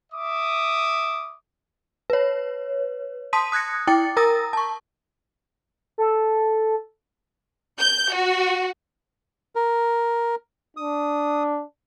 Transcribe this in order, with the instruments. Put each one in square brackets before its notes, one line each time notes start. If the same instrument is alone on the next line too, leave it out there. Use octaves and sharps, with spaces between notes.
[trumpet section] E5 D6 D#6
[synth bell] B4 C#5
A5 C6 D#6 B6 D#7
D#6 F#6 G#6 A#6 C#7
E4 G5 D6 A6 C#7
A#4 A#5 D#6 E6 A6 A#6
A5 C#6
[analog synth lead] A4
[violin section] G6
F#4
[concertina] A#4
[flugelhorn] D4 [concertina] D#6